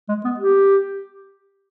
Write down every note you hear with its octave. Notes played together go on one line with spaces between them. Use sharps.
G#3
B3
G4